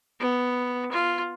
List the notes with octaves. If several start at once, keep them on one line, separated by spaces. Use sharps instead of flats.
B3
F4